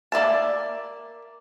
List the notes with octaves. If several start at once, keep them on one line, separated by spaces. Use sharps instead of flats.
A#3 D5 E5 A5